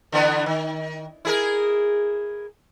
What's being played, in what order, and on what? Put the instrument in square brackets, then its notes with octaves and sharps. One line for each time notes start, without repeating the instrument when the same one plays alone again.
[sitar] D3 E3 B3
D#3
E4 G#4 A#4